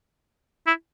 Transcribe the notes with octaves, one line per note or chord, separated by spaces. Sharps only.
E4